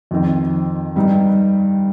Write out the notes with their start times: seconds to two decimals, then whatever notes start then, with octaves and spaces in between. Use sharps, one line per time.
0.11 F2 D#3 C4
0.96 G2 G3 D#4